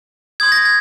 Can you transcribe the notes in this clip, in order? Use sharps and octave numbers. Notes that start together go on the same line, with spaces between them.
C6 D#6 G6 G#6
A#6
G#6